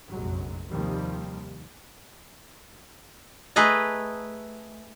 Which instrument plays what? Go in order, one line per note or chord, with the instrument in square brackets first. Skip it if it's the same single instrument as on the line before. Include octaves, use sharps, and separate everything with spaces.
[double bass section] F1 A#1 F#2 F#3 G#3
D#2 C3 D#3 F3 G3
[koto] A3 G#4 B4 D#5 A#5